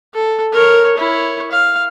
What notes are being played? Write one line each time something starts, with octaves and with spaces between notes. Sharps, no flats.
A4
A#4 C#5
E4 C#5
F5